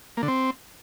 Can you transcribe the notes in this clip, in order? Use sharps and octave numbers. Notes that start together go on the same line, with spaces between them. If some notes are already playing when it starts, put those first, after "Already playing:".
A#3
D3
C4